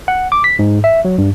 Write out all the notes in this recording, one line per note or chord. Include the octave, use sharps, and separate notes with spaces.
F#5
D6
B6
G#2
E5
F#3
G2